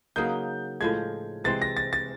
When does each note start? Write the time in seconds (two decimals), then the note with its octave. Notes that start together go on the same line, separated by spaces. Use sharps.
0.16 C#3 F#3 A#3 D#4 G6
0.81 A2 F3 G#3 G#6
1.44 C3 E3 G#3 C4 A6
1.62 A#6
1.77 A6
1.93 A6